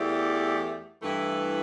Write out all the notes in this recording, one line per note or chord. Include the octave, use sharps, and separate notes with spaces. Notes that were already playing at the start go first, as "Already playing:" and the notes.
Already playing: E2 E3 A3 G4 D5
G2 E3 A3 E4 B4